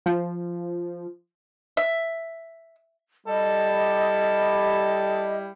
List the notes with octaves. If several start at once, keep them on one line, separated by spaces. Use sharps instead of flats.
F3
E5
G3 E4 A4 D#5